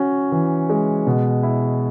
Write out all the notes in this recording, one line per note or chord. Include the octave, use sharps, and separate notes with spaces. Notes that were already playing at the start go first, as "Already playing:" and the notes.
Already playing: C#4 F#4
E3
G#3
B2
E4